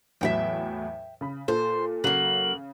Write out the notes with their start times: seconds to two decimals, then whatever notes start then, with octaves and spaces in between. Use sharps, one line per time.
0.21 E2 A2 F#3 E5 F#5 G5
1.21 C#3 B5
1.48 A#2 A4 C5
2.04 C#3 F#3 A#3 F#7